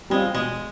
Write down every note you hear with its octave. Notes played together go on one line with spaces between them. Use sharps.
G3 G#3 C4 F4
B2 G#3